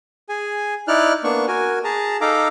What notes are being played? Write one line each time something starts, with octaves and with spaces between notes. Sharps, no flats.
G#4 G#5
D#4 E4 D5 F6 F#6
A#3 B3 D4 C#6
F#4 A#4 G#5
G#4 A5 A#5
D#4 A4 F5 A#5 D6